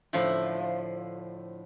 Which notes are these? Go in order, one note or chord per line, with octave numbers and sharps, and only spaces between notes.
A2 D3 F3